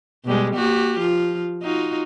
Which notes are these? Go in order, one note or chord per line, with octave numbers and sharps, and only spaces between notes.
B2 G3 G#3
A#3 F#4 G4
F3 F4
D#4 F4 F#4